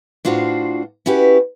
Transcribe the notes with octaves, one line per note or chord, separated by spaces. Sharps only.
A2 D4 F4 F#4 C5
C#4 E4 F#4 G4 B4